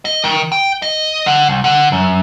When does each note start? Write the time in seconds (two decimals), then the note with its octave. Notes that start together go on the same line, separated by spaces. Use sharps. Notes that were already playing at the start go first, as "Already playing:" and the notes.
0.05 D#5
0.24 D#3
0.52 G5
0.82 D#5
1.26 D3
1.49 C2
1.64 D3
1.92 F#2